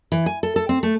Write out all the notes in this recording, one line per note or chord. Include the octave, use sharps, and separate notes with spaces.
E3
G#5
A4
A4
C4
A3